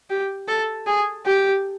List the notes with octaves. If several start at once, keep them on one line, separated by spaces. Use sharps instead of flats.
G4
A4
G#4
G4